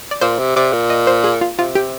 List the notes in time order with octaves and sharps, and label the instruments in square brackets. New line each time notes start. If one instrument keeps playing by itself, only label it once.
[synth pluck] D5
[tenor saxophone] A#2 [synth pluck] C5
[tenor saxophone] C3
[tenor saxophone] C3 [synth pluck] D5
[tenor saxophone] A#2
[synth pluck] D#5
C5
G#4
F4
[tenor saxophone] C3 [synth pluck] F4
[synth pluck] G4